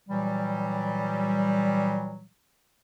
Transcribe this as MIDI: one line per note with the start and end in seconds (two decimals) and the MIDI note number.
0.09 2.26 46
0.09 2.26 52
0.09 2.26 54
0.09 2.26 55